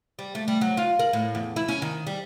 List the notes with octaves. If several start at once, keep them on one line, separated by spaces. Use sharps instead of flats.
G3
A3
G3
F#3
F4
A#4
A2
E2
E4
C#4
D#3
G3